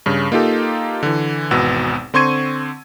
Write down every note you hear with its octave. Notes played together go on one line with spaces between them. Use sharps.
G2 C#3
A#3 D#4 F4 G4 A4
D3 E3
G#1 E2 B2 B3 E6
D3 C4 C6 C#6 G#6 D#7